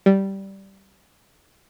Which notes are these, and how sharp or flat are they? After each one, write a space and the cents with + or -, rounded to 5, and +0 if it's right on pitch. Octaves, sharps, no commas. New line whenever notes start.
G3 -10